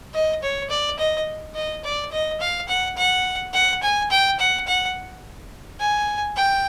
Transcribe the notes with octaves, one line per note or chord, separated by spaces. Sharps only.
D#5
C#5
D5
D#5
D#5
D5
D#5
F5
F#5
F#5
F#5
G#5
G5
F#5
F#5
G#5
G5